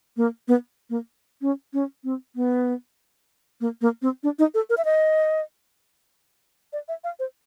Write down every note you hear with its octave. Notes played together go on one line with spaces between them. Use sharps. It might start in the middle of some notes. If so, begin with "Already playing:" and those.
A#3
B3
A#3
C#4
C#4
C4
B3
A#3
A#3
C4
D4
D#4
A4
A#4
E5
D#5
D5
E5
F5
C5